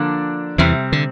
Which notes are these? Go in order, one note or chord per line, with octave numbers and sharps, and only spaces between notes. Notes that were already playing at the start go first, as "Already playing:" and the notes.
Already playing: D3 F3 A#3 D4
E2 C3 E3 G3 C4
D3